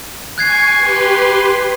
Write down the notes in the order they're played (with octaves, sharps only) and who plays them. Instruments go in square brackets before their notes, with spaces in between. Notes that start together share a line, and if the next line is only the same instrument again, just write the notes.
[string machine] G#5 C#6 [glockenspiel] F#6 G#6 C7
[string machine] G4 B4 C6